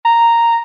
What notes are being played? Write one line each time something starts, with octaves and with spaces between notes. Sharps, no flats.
A#5